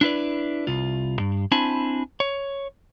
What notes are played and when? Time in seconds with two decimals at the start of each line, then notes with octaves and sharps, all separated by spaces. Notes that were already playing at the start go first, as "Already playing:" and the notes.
0.01 D4 E4 B4 D5
0.67 C2 F4
1.19 G2
1.52 C4 D4 E4 G#5 A5 B5
2.20 C#5